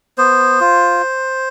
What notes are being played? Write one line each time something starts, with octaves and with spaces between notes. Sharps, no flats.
B3 C5
F4